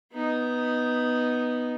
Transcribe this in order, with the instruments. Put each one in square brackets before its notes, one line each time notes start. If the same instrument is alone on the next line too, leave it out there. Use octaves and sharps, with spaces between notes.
[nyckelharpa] B3 D#4